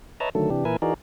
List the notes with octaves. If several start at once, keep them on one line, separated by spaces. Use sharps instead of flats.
B4 C#5 D#5 E5 A5 A#5
D3 D#3 F#3 A3 A4
C3 E3 D4 G4
A#2 E3 A#4 B4 E5 G#5
E3 D#4 F#4 G#4 A#4 D5